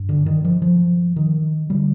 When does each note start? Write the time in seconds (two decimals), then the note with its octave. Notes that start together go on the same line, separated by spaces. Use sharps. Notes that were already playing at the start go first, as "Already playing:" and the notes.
Already playing: G2
0.09 D3
0.26 D#3
0.44 F3
0.62 F3
1.16 D#3
1.70 D3 G3